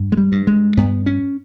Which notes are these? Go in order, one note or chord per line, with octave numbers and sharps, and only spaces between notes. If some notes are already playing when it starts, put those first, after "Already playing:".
Already playing: G2
G#3
G3
G2
G#3
G2 B3
C#4